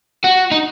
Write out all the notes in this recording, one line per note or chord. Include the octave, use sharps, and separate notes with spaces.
F#4
D#4